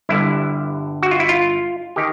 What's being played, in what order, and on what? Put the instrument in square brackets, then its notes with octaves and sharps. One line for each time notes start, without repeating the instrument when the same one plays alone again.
[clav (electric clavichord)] G1 G2 D3 E4
F#4
F4
E4
F4
D#3 G4